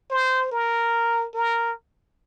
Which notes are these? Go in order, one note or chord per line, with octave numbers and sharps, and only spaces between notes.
C5
A#4
A#4